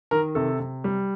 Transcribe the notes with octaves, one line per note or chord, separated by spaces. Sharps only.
D#3 A#4
C3 A4
C3
G3